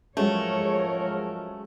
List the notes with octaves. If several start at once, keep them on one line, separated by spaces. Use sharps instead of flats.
G#2 F3 F#3 G#3 A3 C#4 A#4 C#5